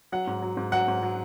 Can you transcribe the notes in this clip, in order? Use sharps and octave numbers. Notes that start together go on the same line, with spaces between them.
F#3 F#5
G#2
F#3
G#2
F#3 F#5
G#2
F#3